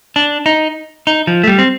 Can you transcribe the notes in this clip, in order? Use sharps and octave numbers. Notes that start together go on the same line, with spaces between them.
D4
D#4
D#4
F3
A3
G3
C4